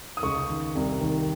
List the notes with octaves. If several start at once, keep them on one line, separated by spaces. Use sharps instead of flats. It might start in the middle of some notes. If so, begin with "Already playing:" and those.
D#6
C#2 C#6
D#3
C2
D#3